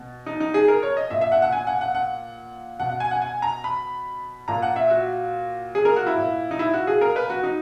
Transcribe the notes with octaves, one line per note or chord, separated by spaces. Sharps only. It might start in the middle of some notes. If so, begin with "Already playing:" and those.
Already playing: B2
D#4
D#4
G#4
A#4
C#5
D#5
A#2 E5
E5
F#5
F#5
G#5
F#5
F#5
F#5
B2 F#5
F#5
G#5
F#5
G#5
A#5
B5
A#2 A#5
F#5
E5
F#4
G#4
A#4
F#4
E4
A#2
D#4
E4
F#4
G#4
A#4
B4
F#4
D#4